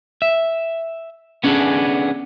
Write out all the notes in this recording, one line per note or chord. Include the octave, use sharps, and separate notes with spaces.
E5
B3 C#4 D4 G#4 A4